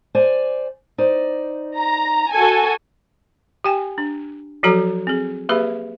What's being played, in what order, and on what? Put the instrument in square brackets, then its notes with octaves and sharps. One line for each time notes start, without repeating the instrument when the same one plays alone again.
[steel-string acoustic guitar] C5 D5 G#5
D#4 C5 D5
[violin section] A#5
F#4 A4 G#5
[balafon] G4 G5 G#5
D4
F3 F#3 F#4 A4 A#5
C4 G#4
A#3 G4 G#4 B4 E5 B5